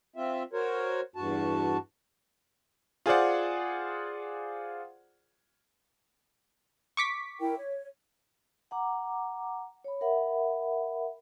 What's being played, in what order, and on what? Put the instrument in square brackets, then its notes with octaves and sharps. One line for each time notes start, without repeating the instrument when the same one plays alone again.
[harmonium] C4 F4 E5
F#4 A#4 C5 C#5
E2 G2 F#4 A5
[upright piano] F4 G#4 C5 D5 F#5
[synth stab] C#6 D6 B6
[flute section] E4 A#4 G5
C#5
[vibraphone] F#5 A#5 D6
C#5 B5
A#4 E5 F#5 B5